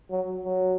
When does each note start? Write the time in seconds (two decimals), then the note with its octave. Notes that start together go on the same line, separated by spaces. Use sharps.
0.11 F#3
0.45 F#3